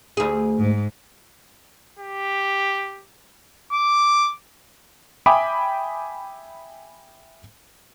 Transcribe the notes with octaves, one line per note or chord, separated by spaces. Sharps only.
D2 G#4
G#2
G4
D6
E5 G5 G#5 B5 D6 D#6